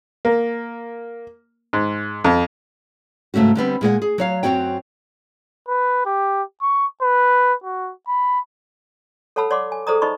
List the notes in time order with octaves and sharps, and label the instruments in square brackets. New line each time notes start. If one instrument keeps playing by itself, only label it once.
[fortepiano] A#3
G#2
F2
[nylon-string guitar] G#2 C#3 A3 C#4 F#4
D3 G3 B3 C4
A#2 G#3 A#4 F#5
G#4
F#3 C#5 F5
F#2 C#3 C4 F#4 C#5 G5
[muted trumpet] B4
G4
C#6
B4
F#4
B5
[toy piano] A4 C#5 F#5 A5 B5 E6
C#5 D5 F#5 C6 D6
G#5
G#4 A4 C5 D5 A#5 D#6
D#4 C5 D5 D#5 B5 C#6